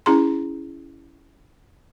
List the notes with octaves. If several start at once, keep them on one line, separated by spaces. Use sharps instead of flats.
C#4 E4 G#4 A#5 C6